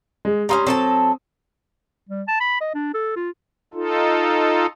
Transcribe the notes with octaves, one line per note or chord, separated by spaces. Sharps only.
G#3
G3 A#3 C#4 A#5 C6 D#6
F#3 C4 A4 A5
G3
A5
B5
D#5
D4
A4
F4
D#4 F4 A4